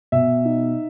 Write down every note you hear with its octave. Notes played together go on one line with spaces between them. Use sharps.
B2 E5
D#4